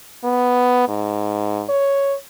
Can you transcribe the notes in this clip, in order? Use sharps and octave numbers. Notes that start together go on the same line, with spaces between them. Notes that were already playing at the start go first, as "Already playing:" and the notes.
B3
G#2
C#5